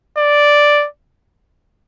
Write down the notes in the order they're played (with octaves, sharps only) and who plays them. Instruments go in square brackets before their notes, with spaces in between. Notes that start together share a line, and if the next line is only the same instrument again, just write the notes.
[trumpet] D5